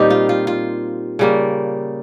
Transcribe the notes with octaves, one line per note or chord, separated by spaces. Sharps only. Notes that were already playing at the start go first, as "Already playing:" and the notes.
Already playing: A#2 G3 C4 D#4 G4
F4
F4
F4
C#3 G3 A#3